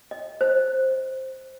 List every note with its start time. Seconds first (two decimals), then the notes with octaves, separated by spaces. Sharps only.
0.11 D#5
0.41 C5